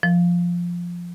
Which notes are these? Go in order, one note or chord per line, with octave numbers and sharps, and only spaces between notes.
F3